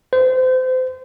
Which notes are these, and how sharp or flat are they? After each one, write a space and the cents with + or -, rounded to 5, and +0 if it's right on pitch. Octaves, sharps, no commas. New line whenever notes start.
C5 -30